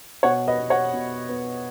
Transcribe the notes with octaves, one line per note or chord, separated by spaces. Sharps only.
B2 C#5 F#5
B4 D#5
B3
C#5 F#5
B2
B3